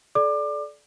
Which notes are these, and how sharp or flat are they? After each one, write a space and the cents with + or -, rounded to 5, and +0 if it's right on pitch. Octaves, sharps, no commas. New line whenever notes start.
A4 -40 D5 +0 D6 +25